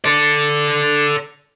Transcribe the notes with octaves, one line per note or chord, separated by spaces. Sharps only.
A4 D5